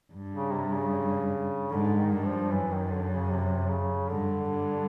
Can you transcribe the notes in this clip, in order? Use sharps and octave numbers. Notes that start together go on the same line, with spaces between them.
G2
C#3
C3
C#3
G#2 D3
D#3
G2
F3
F#2 E3
D#3
D3
C#3
C3
C#3
G2 D3
G2